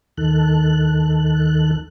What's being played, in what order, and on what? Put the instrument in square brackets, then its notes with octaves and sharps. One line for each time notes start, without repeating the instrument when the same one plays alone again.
[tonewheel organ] D#2 D#3 A4 F#6